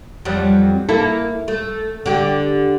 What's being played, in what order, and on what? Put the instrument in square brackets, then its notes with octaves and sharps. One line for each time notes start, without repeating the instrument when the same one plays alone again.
[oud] F2 F#3 G3
A#3 E4 A4
A3
D3 G4